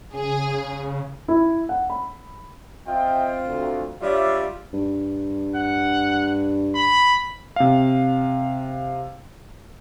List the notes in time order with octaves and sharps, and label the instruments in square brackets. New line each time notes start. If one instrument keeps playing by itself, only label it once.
[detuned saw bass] C#3 [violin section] G#4
[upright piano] E4
F#5
B5
[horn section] C4 F4 [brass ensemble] D#5 E5 G5
[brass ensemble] D2
[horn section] G3 D4 F4 [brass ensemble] C#5 D5 E5
[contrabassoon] G2
[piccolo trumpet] F#5
B5
[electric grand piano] C3 F5